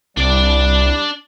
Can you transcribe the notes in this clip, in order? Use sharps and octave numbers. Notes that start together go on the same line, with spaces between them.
C2 G3 D4 D5